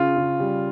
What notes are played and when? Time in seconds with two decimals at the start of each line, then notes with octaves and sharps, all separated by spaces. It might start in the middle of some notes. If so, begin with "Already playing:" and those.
Already playing: C#3 F4
0.17 C#3
0.40 G3